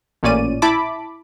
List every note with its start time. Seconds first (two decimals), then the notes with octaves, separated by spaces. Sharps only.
0.23 A1 A#2 C#4 D5 D#7
0.62 E4 A5 B5 D6